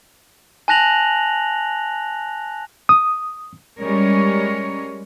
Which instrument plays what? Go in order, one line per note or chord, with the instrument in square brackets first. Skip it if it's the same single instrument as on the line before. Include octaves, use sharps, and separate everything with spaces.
[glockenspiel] G#5 A5 F#6 A#6 F7 F#7
[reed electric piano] D#6
[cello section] G3 G#3 C#4 A#4 C#5